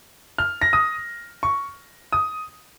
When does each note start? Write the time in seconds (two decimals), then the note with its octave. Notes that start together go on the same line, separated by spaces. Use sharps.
0.38 F6
0.62 A#6
0.73 D#6
1.43 C#6
2.13 D#6